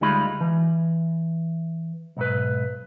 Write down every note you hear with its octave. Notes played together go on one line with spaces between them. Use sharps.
D2 G3 G#3 D#4 F4 B5
E3
B1 G#2 B4